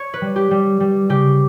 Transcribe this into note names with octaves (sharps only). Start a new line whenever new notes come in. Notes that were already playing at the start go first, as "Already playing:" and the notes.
Already playing: C#5
B4
G3
G4
G3
G3
C#3 G4